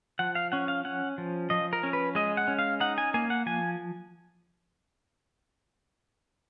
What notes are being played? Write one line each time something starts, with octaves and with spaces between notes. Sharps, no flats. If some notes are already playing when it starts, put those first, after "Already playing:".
F3 F#5
F5
C#4 F#5
F5
C#4 F#5
F3
F3 D#5
A#4
C#4
B4
G#3 D#5
F#5
C#4
F5
D#4 F#5
G#5
A#3 G#5
F#5
F3 G#5